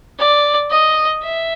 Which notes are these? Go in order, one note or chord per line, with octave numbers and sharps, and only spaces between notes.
D5
D#5
E5